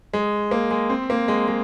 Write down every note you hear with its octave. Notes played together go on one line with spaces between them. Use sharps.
G#3
A#3
G#3
C4
A#3
G#3
G#3